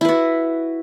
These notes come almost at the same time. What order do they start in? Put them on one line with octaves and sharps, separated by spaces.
E4 B4 F#4